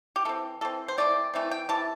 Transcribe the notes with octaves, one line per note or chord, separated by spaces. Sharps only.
G4
E3 C4 A4
E3 C4 A4
C5
E3 A3 C4 D5
E3 A3 C4
G5
C3 E3 A5